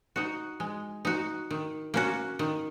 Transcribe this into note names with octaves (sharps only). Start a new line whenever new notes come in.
D#4 F#4
G#3
D#4 F#4
D#3
A#3 C#4 F#4
D#3